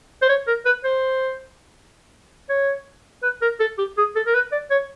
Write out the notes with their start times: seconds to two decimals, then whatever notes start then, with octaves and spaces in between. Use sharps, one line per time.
0.22 C5
0.29 C#5
0.47 A#4
0.65 B4
0.84 C5
2.49 C#5
3.23 B4
3.42 A#4
3.60 A4
3.78 G4
3.98 G#4
4.16 A4
4.27 A#4
4.34 B4
4.52 D5
4.71 C#5